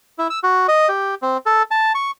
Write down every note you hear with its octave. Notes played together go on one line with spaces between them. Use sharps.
E4
E6
F#4
D#5
G4
C4
A4
A5
C#6